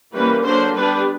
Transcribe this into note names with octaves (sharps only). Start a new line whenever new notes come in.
E3 G3 A#3 C#4 B4
D3 F#3 A#3 D4 C5
G3 B3 D4 B4